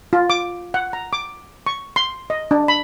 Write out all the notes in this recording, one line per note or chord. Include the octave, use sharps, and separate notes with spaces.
F4
D6
F#5
A#5
D6
C#6
C6
D#5
D4
B5